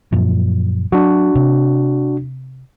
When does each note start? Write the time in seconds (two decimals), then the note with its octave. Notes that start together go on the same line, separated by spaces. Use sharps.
0.12 F#2 A#2 F3
0.92 F#3 D4 F#4
1.35 C3